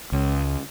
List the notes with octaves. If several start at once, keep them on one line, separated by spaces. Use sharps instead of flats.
C#2